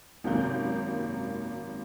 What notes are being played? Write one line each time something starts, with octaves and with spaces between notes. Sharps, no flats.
G#1 F#2 C3 A#3 G6